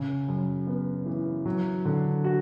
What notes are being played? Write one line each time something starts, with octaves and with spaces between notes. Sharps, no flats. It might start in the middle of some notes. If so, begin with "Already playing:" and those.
Already playing: C#3
F#2
B3
E3
F#3
D3
F#4